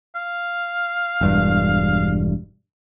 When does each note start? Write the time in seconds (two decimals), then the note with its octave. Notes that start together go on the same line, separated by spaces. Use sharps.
0.16 F5
1.21 E1 G2